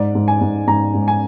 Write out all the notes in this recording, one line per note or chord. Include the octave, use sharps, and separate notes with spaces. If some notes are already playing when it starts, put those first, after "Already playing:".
Already playing: G#2 D5
G#2
G#5
G#2
G#2 A#5
G#2
G#5